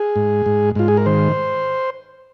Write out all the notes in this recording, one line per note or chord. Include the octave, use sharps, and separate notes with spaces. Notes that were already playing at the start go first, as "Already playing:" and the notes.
Already playing: G#4
G#2
G#2
G#2 F4
G#4
A#4
D#3 C5